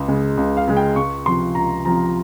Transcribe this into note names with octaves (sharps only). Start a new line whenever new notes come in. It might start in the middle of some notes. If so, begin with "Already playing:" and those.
Already playing: C#2
C#3 G#3
C#2
F5
C#3 G#3
G5
C#2 C#6
C3 F3 C6
C#2 A#5
C3 F3 A#5